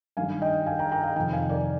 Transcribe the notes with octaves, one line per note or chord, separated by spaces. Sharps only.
G2 D#3 G3 F5 G#5
D#5 G5
F5 G#5
G5 A#5
G5 A#5
F5 G#5
F2 C3 D#3 G5 A#5
F5 G#5
A#4 D5